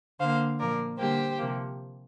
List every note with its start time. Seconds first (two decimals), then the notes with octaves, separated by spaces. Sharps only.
0.19 D3 A#3 C5 F5
0.59 A#2 F3 A#3 A#4 D5
0.98 D3 G3 A#3 G4 C5
1.38 C3 F3 A#3